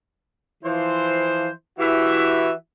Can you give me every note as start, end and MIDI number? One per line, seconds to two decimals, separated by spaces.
0.64 1.49 52
0.64 1.49 53
0.64 1.49 72
1.79 2.51 52
1.79 2.51 64
1.79 2.51 66
1.79 2.51 67
1.79 2.51 76